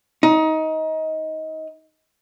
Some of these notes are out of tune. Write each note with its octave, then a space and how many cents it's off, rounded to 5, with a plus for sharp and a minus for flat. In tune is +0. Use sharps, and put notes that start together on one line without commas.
D#4 +20